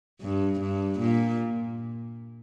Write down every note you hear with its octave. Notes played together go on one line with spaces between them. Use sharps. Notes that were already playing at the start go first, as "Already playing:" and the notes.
G2
G2
A#2